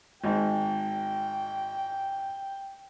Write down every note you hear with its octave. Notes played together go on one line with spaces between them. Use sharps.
G#1 G#2 G5